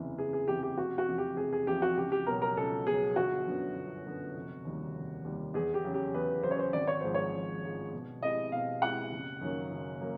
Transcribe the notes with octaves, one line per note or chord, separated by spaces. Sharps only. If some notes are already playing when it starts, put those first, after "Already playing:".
Already playing: F#1 E2 C3 E3
F#1 G#4
G#4
E2 C3 E3 G4
G4
F1 F#4
F#4
E2 C3 F3
G4
F1 G#4
G#4
E2 C3 F3 G4
F#4
C#2 G4
G4
B2 F#3 A#4
A#4
C#2 A4
B2 F#3 G#4
G1 F#4
F#2 D3 F#3 B3
G1
F#2 D3 F#3 B3
F1
D#2 D#3 G3
F1
D#2 D#3 G3
E2 G#4
G4
C#3 F#3
G4
E2 B4
C#3 F#3 C5
C#5
C5
G#1 D5
C#5
G#2 F3 G#3 C5
C#5
G#1
G#2 F3 G#3
B2
G#3 C4 E4 G4 D#5
B2 F5
G#3 C4 E4 G4 F#5
F#1
F#2 D#3 F#3 A#3
F#1
F#3 A#3